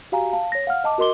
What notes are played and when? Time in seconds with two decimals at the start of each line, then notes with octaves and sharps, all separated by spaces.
0.12 F#4 G4 F5 G#5 A#5
0.33 F5 A5
0.52 C#5 A#6
0.67 F5 F#5 F6
0.84 D#5 A5 D6
0.98 F#4 A#4 D#5 C6 D6 G7